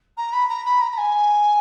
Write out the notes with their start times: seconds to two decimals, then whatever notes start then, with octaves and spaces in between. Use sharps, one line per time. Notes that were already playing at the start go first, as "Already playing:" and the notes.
0.17 A#5
0.32 B5
0.49 A#5
0.65 B5
0.81 A#5
0.91 A#5
0.97 G#5